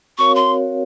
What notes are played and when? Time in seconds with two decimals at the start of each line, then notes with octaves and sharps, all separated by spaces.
0.18 C4 F#4 A#4 C#5 F5 C#6
0.35 C6